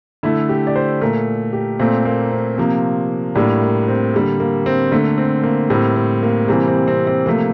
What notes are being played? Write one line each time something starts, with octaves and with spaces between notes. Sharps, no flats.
D3 A3 E4
G4
D5
C5
A#2 A3 A#4
G4
A#2 A3 C4
A#3
C4
C3 F3 A#3
A2 G3 A#3 D4
A#3
C4
D3 G3 A#3
A#3
C4
D3 A3 A#3
C4
A#3
A2 G3 A#3 C4
C4
A#3
C3 E3 G3 A#3 C4
C4
C4
C4
C3 F3 A3 A#3